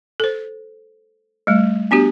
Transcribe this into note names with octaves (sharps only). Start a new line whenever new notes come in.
A4 C5
G3 A3
B3 D4 F#4 G4